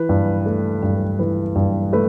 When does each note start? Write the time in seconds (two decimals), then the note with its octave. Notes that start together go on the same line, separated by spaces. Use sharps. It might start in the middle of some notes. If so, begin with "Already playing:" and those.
Already playing: E3 B4
0.09 G2
0.46 A3
0.83 G2
0.95 A4
1.19 E3 B4
1.56 G2
1.93 A3 B4